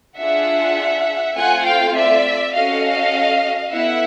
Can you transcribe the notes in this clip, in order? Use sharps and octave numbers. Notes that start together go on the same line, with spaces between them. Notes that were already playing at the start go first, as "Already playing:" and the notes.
D4 F4 G#4 E5 F#5
A3 C4 F4 F#5 G#5
F5 G5
D5 E5
C#4 F#4 A4 D#5 F5
B3 E4 A4 E5 F#5